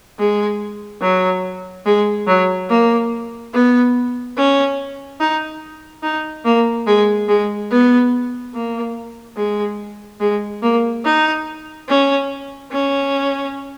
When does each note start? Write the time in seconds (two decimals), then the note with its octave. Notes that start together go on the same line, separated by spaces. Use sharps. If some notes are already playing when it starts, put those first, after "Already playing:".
0.19 G#3
1.01 F#3
1.86 G#3
2.27 F#3
2.69 A#3
3.53 B3
4.37 C#4
5.20 D#4
6.03 D#4
6.45 A#3
6.87 G#3
7.28 G#3
7.71 B3
8.54 A#3
9.37 G#3
10.20 G#3
10.62 A#3
11.04 D#4
11.88 C#4
12.71 C#4